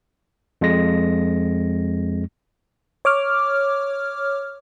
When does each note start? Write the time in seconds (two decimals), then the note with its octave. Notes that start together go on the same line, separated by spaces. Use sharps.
0.61 F2 G#3 A#6
3.05 C#5 D6 F6